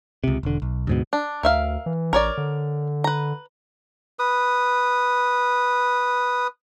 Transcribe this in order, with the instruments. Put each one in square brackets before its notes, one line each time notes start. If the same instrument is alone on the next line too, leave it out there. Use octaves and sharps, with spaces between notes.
[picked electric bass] C#2 C3
E1 D3
B1
D2 G#2 B2
[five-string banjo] D4
[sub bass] D2 [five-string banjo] A#4 E5 F5
[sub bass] E3
[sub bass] A1 [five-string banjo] A#4 C#5 D5
[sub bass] D3
[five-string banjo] B4 A#5
[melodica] B4 D#6